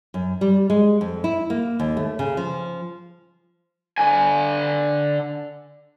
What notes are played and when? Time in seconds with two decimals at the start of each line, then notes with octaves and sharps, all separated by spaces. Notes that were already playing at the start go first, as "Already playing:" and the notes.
0.14 F#2
0.41 G3
0.70 G#3
1.01 F2
1.24 E4
1.50 A#3
1.80 D#2
1.97 A3
2.19 C#3
2.37 F3
3.98 D3 G#5